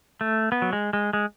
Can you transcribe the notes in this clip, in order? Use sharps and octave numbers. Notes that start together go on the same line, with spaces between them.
A3
B3
F#3
G#3
G#3
G#3